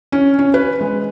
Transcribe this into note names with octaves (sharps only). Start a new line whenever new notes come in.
C#4
C#4
B4
G#3